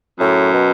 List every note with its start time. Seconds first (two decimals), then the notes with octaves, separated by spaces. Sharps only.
0.19 F#2 A2
0.53 B2